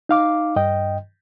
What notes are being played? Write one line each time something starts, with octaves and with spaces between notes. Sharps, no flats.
D#4 F5 D6
G2 D#5 G5